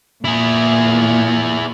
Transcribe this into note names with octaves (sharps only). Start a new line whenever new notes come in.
A#2 E4 G#4